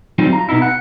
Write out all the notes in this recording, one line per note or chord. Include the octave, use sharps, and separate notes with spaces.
F#3 G3 A3 C4 D#4 F4
F4 A#5
B2 B3 D#4 E4
F#5